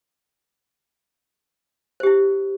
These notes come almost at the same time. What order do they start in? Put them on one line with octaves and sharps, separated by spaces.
C5 G4 E4